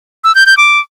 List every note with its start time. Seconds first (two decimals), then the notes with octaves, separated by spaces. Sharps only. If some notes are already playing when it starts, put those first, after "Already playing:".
0.24 E6
0.35 G6
0.46 G6
0.57 D6